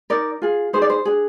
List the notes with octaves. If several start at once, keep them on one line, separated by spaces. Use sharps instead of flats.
D#4 A#4 D5
F4 G#4
D#4 G#4 C5
D5
C5
D4 G#4